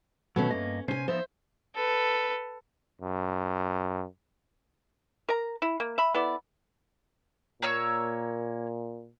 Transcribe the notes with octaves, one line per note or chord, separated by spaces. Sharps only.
B2 D#3 F#3 A3 C#4
G2 A#3 C#4 D#5
C3 C#4 C5 G#5
F3 B3 D#4 C5 E5
A4 B4
F#2
A#4 A#5
E4
A#3
E5 B5
B3 E4 A4 D5
A#2 A#3 C#5 E6